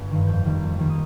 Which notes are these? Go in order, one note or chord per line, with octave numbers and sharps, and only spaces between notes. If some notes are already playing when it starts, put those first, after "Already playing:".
Already playing: G1
G2 D#3
F2 G6
D#3 G3 A#3
F2
D#3 G3 A#3
D#6